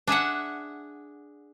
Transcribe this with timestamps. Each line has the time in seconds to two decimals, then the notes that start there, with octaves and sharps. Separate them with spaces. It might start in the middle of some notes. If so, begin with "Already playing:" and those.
0.07 D4 G#4 E5 F#5